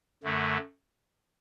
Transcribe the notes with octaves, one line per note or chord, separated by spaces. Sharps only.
F#2 D3 A3